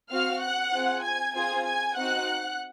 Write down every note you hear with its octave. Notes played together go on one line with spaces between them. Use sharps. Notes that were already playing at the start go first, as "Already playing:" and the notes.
C4 F#4 F5 F6
F#5 F#6
C4 F4 G#4
G#5 G#6
C4 F4 G#4 G#5 G#6
G#5 G#6
C4 D#4 F#4 F#5 F#6